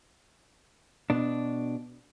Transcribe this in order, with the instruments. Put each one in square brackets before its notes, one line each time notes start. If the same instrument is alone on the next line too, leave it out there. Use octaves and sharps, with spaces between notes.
[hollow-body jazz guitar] B2 D4